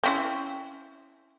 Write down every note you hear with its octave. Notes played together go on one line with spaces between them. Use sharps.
C4 C#4 E4